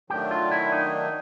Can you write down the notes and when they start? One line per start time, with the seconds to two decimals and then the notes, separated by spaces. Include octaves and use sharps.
0.10 D#3 F#3 A3 D4 G4
0.31 F4
0.51 E4
0.72 D#4